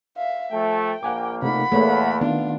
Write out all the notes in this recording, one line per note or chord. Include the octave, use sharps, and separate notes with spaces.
E5 F5
F3 A3 G5
A#1 A#3 F#5 G#5 D6
C3 A3 D#4 F#5 B5
E2 A3 A#3 A4 C#5
D#3 B3 D4 F4